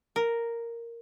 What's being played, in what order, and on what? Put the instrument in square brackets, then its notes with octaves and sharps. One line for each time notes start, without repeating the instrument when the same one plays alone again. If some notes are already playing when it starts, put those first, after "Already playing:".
[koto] A#4